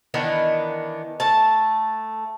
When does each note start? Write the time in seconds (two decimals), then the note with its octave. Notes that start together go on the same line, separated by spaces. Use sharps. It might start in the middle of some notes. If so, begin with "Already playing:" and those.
0.14 D#3 E3 B3 D4
1.20 A3 A5